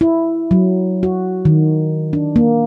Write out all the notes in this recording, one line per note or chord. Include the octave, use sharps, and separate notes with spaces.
E4
F#3
F#4
D#3
D4
A#3